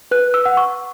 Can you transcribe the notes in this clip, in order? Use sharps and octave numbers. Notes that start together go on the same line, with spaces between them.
B4 F#6
E6
F#5
C#6